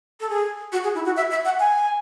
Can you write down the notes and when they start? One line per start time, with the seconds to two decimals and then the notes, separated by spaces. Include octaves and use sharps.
0.20 A4
0.29 G#4
0.72 F#4
0.84 G#4
0.95 E4
1.05 F#4
1.16 E5
1.30 E5
1.45 F#5
1.60 G#5